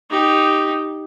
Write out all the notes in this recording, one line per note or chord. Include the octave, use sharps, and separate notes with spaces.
D#4 G4